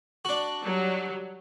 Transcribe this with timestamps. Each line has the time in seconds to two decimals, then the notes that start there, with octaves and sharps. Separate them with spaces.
0.25 D4 F#4
0.63 F#3 G3